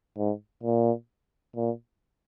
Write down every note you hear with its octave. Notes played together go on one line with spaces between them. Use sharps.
G#2
A#2
A#2